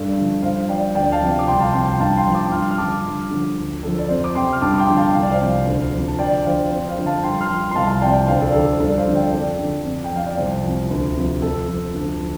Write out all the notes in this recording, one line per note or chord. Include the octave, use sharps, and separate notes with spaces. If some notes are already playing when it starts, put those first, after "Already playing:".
Already playing: G2 A4 D5
D3 F3
G2 C5 F5
F3 D5 G5
D2 D5 G5
F5 A5
C3 F3
D6
C2 G5 C6
F5 A5
C3 F3 G5 C6
G5 C6
G2 F5 A5
G5 C6
F3
A5 D6
G2 C6 F6
F6
D3 F3 A5 D6
G2
D3 F3
D2
D3 F3 A4
D5
F2 C5
D6
C3 F3 G5 C6
F6
G2 A5 D6
D6
G5 C6
D3 F3
F5 A5
C2 F5
D5
C5 F5
C3 F3
D2
C3 F3
A5
D2 D5 G5
D3 F3 C5 F5
F2 C5
C5 F5
D3 F3
F5 A5
G2 G5 C6
C6 F6
F3
C6
C2 F5 A5
A5
C3 F3 D5 G5
D2 C5 F5
A4 D5
D3 F3 A4
C5
G2 A4 D5
C5 F5
D3 F3
D5 G5
F2 A4 D5
D3 F3
F2
G5
F3 F5
D5
C2 C5
F3
C3
D2
C3 F3
F2 A4
F3
D2
F3